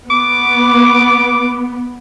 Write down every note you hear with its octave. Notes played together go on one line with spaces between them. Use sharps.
B3 D6